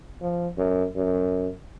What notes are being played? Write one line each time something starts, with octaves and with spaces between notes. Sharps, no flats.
F3
F#2
F#2